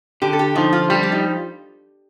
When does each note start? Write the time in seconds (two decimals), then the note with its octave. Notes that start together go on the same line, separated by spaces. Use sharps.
0.22 D3 G4
0.33 A4
0.39 G4
0.56 F3 D#4
0.73 F4
0.90 G3 G4
1.03 D4
1.12 D#4